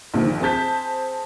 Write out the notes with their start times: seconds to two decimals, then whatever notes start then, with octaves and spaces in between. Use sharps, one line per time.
0.13 A#1 G2 A#2 D3 D#3 F3
0.41 C4 G#4 A5 G6 B6